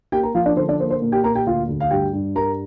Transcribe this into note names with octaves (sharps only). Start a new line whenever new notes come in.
A#3 G4 G5
A#4 A#5
F3 F4 F5
D4 D5
D3 C5
D4 D5
A#3 C5
C5
A#2
G4 G5
A#2 A#4 A#5
G4 G5
D2 F4 F5
D2
F5
G2 G4 G5
G2
G3 A#4 A#5